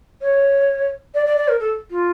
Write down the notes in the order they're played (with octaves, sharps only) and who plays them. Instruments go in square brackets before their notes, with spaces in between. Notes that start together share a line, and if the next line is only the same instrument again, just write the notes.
[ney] C#5
D5
D5
D5
A#4
A4
F4